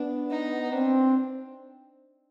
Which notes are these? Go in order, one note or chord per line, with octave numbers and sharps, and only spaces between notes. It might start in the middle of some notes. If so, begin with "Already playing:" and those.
Already playing: B3 D4
D#4
C4 D4